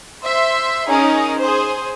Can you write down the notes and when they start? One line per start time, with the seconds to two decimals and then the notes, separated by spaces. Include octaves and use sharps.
0.23 C5 E5 C6
0.88 C#4 D#4 G#4 A#4
1.39 G#4 C5